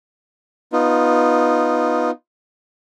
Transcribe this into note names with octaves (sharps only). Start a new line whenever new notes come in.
B3 D#4 F4